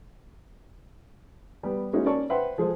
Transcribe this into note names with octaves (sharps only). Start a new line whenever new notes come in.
G3 B3
G#3 A#3 C#4 D#4 E4 F#4
C#4 A#4 D5 A5 C#6
B4 C5 E5 F#5 G5 C6
F3 G#3 G#4 A4 C5